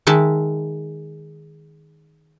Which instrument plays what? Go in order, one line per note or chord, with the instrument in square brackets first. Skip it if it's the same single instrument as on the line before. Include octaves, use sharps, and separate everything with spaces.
[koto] D#3 G#3 E5 A5